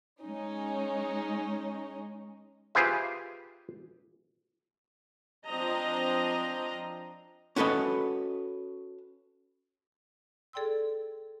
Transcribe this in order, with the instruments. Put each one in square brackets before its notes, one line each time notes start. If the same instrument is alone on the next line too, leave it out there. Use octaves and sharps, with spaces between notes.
[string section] G#3 C#4 D#4
[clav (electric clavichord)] F4 G4 G#4 B4 C5 E5
[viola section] F3 C4 D4 D#5 A#5
[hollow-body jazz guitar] C#4 F#4 A4 B4 D#5
[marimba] G#4 A4 D5 G5 C6 E6